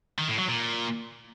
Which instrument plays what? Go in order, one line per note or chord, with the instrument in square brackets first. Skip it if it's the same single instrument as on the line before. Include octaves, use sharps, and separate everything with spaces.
[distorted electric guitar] D#3
A2
F#3
A#2